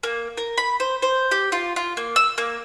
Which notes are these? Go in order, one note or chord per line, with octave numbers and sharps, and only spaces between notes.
A#3
A#4
B5
C5
C5
G4
F4
F4
A#3
E6
A#3